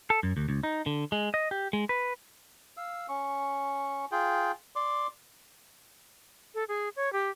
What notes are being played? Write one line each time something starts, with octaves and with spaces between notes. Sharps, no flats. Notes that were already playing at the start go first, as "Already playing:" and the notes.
A4
F#2
D2
C#2
D#4
D3
G#3
D#5
G4
G#3
B4
F5 E6
C#4 C#6
F4 G#4 G5
D5 C6 D6
A4
G#4
C#5
G4